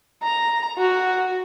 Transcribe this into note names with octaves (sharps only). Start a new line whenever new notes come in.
A#5
F#4